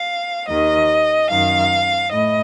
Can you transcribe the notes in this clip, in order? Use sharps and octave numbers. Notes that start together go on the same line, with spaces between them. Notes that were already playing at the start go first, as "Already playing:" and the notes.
Already playing: F5
D#2 D#3 D#5
F#2 D#3 F5
A2 D#5